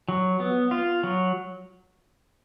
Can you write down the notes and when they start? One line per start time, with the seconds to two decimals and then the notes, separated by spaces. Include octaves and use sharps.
0.09 F#3
0.40 B3
0.71 F4
1.03 F#3